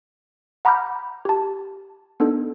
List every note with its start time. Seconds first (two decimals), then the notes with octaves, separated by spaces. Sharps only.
0.65 F#5 A#5 B5 D6 F6 G6
1.25 G4 A5
2.20 B3 D4 D#4 A4